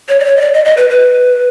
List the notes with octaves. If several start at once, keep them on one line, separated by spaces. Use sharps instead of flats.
C#5
D5
C#5
D#5
D5
D#5
D#5
B4
B4